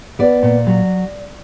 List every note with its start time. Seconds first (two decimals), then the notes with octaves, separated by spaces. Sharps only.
0.19 B3 D5
0.43 A#2
0.67 F#3